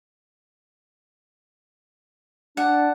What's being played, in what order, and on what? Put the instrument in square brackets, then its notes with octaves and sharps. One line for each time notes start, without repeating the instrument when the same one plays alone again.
[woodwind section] D4 [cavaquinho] F#5